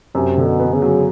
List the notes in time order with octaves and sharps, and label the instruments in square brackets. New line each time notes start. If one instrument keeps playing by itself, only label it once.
[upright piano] F#2 [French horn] C3
[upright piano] D3
[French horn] B2
[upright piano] B3
[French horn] C#3
[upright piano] F#3